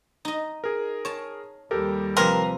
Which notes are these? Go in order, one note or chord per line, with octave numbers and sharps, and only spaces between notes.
D#4 D#5
G#4 A#4
C#5 A5
D#2 G3 G4 A4 A#4
C3 F3 C4 A#4 B4 C6